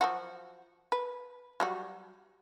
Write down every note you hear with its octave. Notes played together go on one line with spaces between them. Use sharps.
F3 F#3 F#4
B4
F#3 G3 F#4